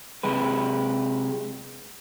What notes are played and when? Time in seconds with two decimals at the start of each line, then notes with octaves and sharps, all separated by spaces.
0.23 C3 G#3 G4 B4